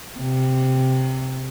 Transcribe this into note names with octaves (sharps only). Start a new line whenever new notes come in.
C3